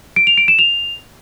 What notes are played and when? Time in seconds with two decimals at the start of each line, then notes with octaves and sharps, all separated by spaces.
0.16 D7
0.27 F7
0.38 D7
0.48 E7
0.59 F7